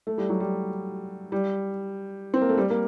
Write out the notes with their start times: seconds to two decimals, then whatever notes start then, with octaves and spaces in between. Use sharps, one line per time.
0.07 A3
0.18 G3
0.29 F#3
0.40 G3
1.32 G3
2.34 C4
2.41 A#3
2.49 A3
2.57 G3
2.70 A#3